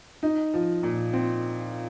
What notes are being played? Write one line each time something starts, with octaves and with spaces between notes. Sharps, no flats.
D#4
F3
A#2
C4